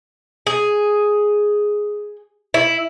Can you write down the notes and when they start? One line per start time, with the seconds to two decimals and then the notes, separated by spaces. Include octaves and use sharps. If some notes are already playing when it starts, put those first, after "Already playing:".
0.47 G#4
2.54 E4